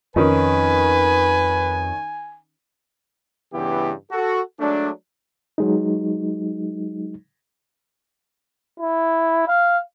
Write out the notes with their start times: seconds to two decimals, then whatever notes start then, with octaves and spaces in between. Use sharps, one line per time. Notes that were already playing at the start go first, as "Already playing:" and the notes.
0.16 F2 D#3 C#4 D#4 B4 G#5
3.54 G2 C#3 E3 B3 E4 G4
4.11 F#4 A4
4.60 F#3 G#3 A3 D4
5.58 F#3 G#3 D#4
8.80 E4
9.48 F5